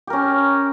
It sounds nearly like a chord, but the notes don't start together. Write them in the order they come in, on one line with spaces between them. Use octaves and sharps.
G4 A#4 C#4